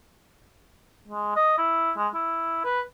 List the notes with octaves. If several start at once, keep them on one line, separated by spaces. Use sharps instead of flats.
G#3
D#5
E4
G#3
E4
B4